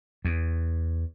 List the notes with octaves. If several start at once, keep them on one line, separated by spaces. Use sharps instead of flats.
E2